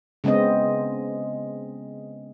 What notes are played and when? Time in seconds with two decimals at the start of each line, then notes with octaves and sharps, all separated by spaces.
0.24 C#3 G#3 B3 C4 D#5